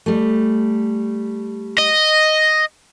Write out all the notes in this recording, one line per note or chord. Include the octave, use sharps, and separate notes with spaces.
G3 A3
D#5